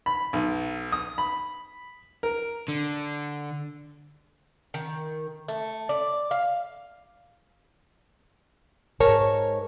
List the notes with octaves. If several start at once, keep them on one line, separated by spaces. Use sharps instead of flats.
B5
B1
D#6
B5
A#4
D3
D#3
A3
D5
F5
G#2 A#4 C#5 A5